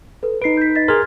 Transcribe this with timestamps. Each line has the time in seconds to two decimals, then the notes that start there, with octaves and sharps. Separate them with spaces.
0.23 A4 B4
0.42 D#4 B4 C7 D7
0.57 G6 B6
0.75 D#5 A6 B6
0.88 G#4 A#4 C6 F6 G#6